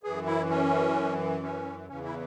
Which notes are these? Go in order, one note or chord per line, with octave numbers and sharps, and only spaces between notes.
F#2 E3 G#4
E4
C#4
C#4
E2 C#3 E3 C#4
E4